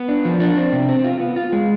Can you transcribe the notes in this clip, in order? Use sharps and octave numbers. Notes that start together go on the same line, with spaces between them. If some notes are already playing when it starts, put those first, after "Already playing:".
Already playing: B3
D4
F3
D4
C4
C3
C4
F4
B3
F4
G#3